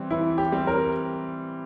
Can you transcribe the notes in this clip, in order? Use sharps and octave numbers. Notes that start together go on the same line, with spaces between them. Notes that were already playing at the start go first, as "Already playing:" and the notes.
Already playing: E3 G3 C4
E3 E4
G4
G3 C4
A#4